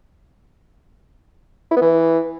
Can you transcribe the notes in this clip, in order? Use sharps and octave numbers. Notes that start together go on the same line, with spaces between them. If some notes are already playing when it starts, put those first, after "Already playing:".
E4
B3
E3